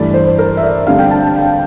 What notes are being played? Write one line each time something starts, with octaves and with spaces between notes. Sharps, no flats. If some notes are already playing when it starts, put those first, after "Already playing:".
Already playing: G2 E3 A3 D5
C5
A#4
E5
D5
D3 G3 C4 F5
G5
A5
G5